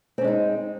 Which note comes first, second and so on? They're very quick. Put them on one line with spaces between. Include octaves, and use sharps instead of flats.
C4 C#4 G#3 D#4